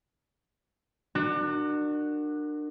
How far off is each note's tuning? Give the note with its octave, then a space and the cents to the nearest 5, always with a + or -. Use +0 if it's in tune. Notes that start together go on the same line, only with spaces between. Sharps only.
D4 +30 F#4 +0 A#4 -20